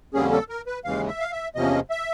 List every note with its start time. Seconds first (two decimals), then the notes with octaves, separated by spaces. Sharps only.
0.14 F2 D3 G3 A#3 C#4 G#4
0.32 A4
0.49 A#4
0.67 B4
0.84 D#2 C#3 E3 G#3 F5
1.08 E5
1.20 F5
1.32 E5
1.55 E2 C3 F3 A#3 C#4 D#5
1.90 E5